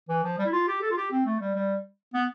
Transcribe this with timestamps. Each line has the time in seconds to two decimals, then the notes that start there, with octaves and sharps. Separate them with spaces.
0.09 E3
0.24 F3
0.38 G3
0.46 E4
0.53 F4
0.68 G4
0.82 A4
0.91 F4
0.97 G4
1.11 C4
1.26 A3
1.41 G3
1.55 G3
2.14 B3